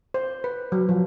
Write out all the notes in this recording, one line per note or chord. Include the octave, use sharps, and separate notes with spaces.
C5
B4
F#3
F3